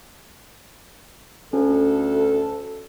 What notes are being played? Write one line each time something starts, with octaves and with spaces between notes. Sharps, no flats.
D2 C#4 A4